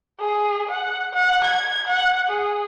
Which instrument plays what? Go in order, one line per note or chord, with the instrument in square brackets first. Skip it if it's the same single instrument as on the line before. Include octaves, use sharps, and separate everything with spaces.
[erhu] G#4
F#5
F#5
G#6
F#5
G#4